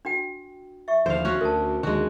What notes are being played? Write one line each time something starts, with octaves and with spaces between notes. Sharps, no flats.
D4 F#4 G5
E5 C#6
D#2 D3 F3 C5 F5
C#4 F#4
D2 A#4 A5
D#2 D3 D#3 G#3 F#4